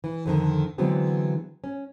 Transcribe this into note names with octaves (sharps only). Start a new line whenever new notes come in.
E3
F2 D3 D#3
D3 E3 F#3 G#3 B3 C4
C#4